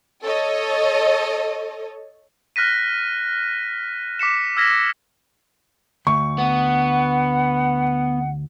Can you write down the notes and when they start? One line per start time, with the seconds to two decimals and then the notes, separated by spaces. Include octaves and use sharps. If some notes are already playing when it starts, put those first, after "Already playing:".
0.23 A4 C#5 D#5
2.56 F6 F#6 A#6 B6 D#7
4.19 D6 B6 C#7 E7
4.57 E6 F6 G#6 A#6 B6
6.07 D2 C#6
6.38 B3 F#5